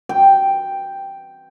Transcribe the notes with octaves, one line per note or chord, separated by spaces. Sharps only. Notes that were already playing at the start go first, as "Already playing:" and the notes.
G5